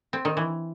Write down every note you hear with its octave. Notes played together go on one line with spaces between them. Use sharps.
C4
D#3
E3